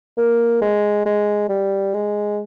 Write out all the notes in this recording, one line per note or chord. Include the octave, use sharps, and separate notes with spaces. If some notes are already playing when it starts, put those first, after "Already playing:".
A#3
G#3
G#3
G3
G#3